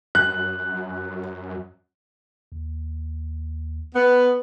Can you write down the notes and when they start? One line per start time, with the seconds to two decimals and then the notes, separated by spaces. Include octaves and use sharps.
0.15 F#2 F#6
2.52 D#2
3.95 B3